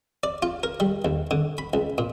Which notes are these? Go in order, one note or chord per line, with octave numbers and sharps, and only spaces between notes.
D5
F4
A#4
G3
D#2
D3
B5
C#2
A#2